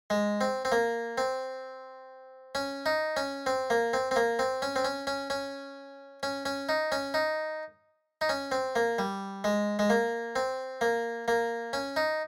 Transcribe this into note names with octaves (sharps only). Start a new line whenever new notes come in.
G#3
C4
C4
A#3
C4
C#4
D#4
C#4
C4
A#3
C4
C4
A#3
C4
C#4
C4
C#4
C#4
C#4
C#4
C#4
D#4
C#4
D#4
D#4
C#4
C4
A#3
G3
G#3
G#3
A#3
C4
A#3
A#3
C#4
D#4